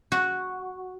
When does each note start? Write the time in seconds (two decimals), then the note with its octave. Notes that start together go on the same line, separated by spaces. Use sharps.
0.12 F#4